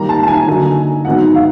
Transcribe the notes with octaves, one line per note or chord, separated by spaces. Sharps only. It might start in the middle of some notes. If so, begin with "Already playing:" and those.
Already playing: D#3 G3 A#3 A#5
A5
A5
G#5
D3 F#3 A#3 D#4 G#5
G#2 D#3 F#3 B3 F#5
F5